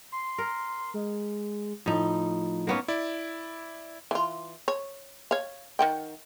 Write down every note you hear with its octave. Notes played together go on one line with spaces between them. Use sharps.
C6
A#4
G#3
A2 F3 D#4
A#3 B3 C#4
E4 D5
E3 F4
C#5
C#5 F5
D#3 F#5 G5